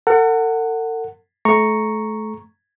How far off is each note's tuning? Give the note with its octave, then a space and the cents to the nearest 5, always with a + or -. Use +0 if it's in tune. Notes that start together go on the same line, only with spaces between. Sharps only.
A4 +45 F#5 +5
A3 -30 A#5 +0 C#6 +0